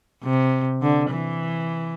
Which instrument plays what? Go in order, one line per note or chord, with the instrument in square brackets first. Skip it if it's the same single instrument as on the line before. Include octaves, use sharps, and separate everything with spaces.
[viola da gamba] C3
D3
E3